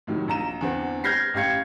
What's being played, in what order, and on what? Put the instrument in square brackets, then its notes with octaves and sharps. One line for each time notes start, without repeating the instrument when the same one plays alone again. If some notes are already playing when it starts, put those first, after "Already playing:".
[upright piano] A2 C3 D#3 F#3
A#1 A#5 E7
E2 D3 B3 C4
F6 G6 G#6 A#6 C7
A1 G4 F5 G#6 C#7